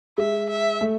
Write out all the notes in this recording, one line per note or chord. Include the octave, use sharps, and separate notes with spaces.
G#3 E5
E5
A3